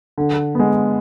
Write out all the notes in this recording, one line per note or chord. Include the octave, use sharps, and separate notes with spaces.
D3
G#3 B3